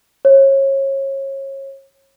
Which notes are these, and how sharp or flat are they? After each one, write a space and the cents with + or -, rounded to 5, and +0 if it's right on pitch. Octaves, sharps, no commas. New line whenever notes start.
C#5 -30